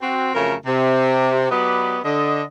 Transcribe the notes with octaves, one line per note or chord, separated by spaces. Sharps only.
C4 F#4
F2 C#3 F#3 A3 A#4
C3
F#3 B3 G4 B4 D5 D#5
D3 D#5